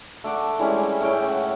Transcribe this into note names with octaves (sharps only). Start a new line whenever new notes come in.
A3 D5 F#5
E3 G3 G#3 C#4
A2 C#4 G5
F#5